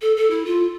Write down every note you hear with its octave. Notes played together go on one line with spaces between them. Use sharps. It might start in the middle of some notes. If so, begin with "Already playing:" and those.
A4
A4
E4
F4